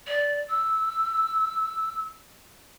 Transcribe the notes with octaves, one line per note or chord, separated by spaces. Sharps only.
D5
E6